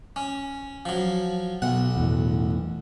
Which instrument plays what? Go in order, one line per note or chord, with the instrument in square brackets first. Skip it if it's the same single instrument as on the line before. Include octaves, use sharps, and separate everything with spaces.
[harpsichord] C#4
F3 F#3
[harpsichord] B1 F#5 [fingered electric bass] B2
[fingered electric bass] E2 A2